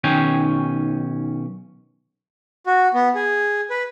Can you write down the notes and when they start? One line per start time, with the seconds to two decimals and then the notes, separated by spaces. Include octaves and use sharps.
0.04 B1 D#3 C#4 G5 G#5
2.67 F#4
2.94 B3
3.15 G#4
3.70 B4